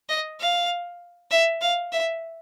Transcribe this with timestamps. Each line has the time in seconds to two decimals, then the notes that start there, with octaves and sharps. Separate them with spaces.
0.09 D#5
0.40 F5
1.31 E5
1.61 F5
1.93 E5